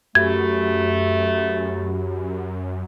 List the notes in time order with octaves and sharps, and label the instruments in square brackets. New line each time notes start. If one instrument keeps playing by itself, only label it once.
[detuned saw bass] F#2 [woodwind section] A3 [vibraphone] F#4 G4 B5 [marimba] G#6